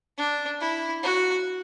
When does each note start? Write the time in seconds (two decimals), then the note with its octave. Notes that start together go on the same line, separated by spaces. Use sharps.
0.17 D4
0.60 E4
1.03 F#4